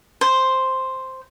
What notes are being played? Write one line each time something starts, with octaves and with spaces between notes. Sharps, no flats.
C5